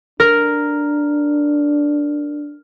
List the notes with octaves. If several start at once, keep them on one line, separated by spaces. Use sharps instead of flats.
D4 A#4